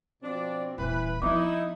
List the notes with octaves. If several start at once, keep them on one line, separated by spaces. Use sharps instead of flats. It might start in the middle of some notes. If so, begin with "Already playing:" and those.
B2 F3 C4 D4 D5
D#1 E3 B4
F3 B3 D#4 E4